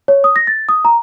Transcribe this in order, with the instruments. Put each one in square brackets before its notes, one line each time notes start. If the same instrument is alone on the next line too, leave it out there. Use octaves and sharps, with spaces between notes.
[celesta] C#5
D#6
A#6
A6
D#6
A#5